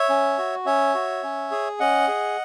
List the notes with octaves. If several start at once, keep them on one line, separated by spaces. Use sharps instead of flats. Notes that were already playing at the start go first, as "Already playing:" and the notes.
Already playing: C#5 E5
C#4
F#4
C#4 C#5 E5
F#4
C#4
G#4
C#4 D#5 F#5
G#4